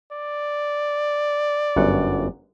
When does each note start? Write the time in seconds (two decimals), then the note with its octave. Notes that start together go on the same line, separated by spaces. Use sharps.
0.12 D5
1.76 G1 F#2 F#5